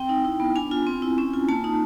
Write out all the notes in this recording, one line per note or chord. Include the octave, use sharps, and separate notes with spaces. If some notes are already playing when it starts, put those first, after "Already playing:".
Already playing: C4 G5
D#4
E4
B3
D4 G#5
F4
C4
E4
C#4
F4
A#3 A5
D#4